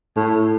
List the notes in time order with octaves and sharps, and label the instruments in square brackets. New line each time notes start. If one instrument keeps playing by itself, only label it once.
[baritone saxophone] A2